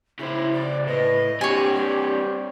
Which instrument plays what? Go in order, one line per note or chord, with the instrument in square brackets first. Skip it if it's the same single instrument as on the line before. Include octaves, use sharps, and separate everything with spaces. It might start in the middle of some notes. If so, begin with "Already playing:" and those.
[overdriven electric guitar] C#3 C5 [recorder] E4
[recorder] D5
[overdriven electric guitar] A2 [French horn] B4 [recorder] D#5
[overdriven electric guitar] C4 D4 [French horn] G4 [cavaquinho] C#5 G#5
[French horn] G3 [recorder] G4